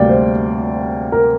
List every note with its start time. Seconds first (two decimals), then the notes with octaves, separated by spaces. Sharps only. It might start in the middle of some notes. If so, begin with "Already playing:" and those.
Already playing: D2 C3 G3 A#3 D5 G5
0.09 C5
1.12 A#4